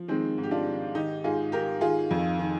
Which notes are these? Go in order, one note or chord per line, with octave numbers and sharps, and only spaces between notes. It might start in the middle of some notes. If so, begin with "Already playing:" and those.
Already playing: F3
D#3 G#3 C4
G#2
G4
D4 F4
D#3
D#3 D#4 G4
G#2 F4 G#4
D#3 G4 A#4
D#3 F4 G#4
F2
D#3